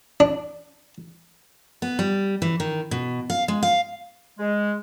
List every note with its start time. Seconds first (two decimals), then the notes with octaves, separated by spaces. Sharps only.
0.20 D4
1.82 B3
1.99 G3
2.42 E3
2.60 D#3
2.91 B2
3.30 F5
3.48 G#3
3.63 F5
4.38 G#3